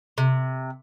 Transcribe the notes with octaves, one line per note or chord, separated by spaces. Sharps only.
C3